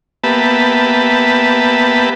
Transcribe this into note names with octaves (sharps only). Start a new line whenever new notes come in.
A#3 B3 G4 B4 E5 A5